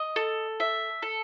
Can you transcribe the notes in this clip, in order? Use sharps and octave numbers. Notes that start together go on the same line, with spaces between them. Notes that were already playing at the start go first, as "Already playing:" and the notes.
Already playing: D#5
A4
E5
A4